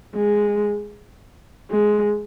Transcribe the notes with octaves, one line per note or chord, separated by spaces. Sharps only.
G#3
G#3